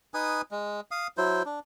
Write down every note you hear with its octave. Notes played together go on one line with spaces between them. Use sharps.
D#4 B4 G#5 D#6
G#3
F5 D#6
F#3 E4 C5
D4